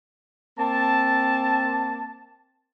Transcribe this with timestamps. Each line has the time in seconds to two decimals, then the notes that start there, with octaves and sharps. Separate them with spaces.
0.58 A#3 C4 A5